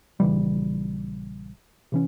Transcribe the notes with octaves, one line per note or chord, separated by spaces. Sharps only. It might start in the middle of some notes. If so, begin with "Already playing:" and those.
A#1 C#3 E3 G3
C3 E3 C#4